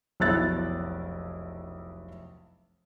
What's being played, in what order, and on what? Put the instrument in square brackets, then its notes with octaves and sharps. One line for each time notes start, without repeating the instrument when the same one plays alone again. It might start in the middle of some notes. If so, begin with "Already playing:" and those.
[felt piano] F1 B1 E4 F#6 A6